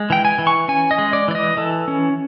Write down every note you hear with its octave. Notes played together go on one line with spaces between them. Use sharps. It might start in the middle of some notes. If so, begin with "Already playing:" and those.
Already playing: G#3
E3 G5
G#5
E3
C#6
C#4 G#5
D#5
G#3
D5
E3 D5
D#5
E3 A4
C#4